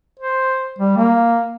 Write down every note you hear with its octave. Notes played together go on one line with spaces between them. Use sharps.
C5
G3
A#3